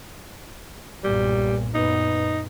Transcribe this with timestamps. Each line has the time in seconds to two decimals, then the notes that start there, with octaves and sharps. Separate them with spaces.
1.04 B1 G2 A#2 G3
1.74 F#2 A#2 B3 D#4